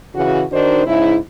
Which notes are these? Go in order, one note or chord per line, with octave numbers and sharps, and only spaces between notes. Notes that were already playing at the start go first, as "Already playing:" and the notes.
C#3 E3 F#4
D#3 D4 D#4 F#4 C5
G#2 C#3 E4